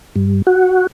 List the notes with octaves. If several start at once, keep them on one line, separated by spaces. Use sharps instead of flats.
G2
F#4